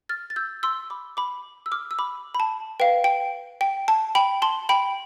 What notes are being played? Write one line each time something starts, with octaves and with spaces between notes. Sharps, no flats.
F6 A6
A6
E6 G6
C6 E6
B5 D6
B5 D6
E6
D6 F6
E6
B5 D6
B5
A5
B4 F5 G5
G5
G5
A5
G5 B5
A5 C6
G5 B5